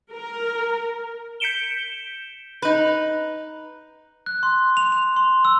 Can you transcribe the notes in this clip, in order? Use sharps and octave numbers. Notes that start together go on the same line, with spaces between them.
A#4
G6 B6 C#7 D7 E7 G7
D#4 B4
F#6
C6
F7
F7
C6
E6